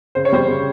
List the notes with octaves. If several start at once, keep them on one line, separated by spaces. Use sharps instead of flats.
C#3 C5
C#5
G3 C5
C#3